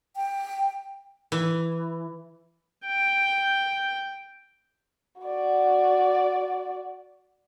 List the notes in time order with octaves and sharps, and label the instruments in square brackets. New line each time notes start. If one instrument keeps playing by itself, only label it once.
[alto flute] G5
[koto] E3
[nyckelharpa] G5
[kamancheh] F#4 D5